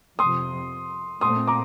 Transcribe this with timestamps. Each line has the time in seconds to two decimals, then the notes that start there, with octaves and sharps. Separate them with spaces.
0.19 F2 C3 F3 C6 D#6
1.21 A#2 A3 C4 C6 D#6
1.47 A#5 D6